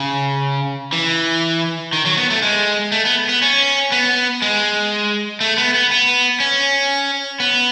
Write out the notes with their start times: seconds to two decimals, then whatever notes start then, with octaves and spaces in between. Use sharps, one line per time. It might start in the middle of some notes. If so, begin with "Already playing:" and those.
Already playing: C#3
0.93 E3
1.93 D#3
2.06 F#3
2.17 B3
2.30 A3
2.42 G#3
2.92 A3
3.05 B3
3.29 B3
3.42 C#4
3.92 B3
4.42 G#3
5.41 A3
5.58 B3
5.74 B3
5.91 B3
6.40 C#4
7.40 B3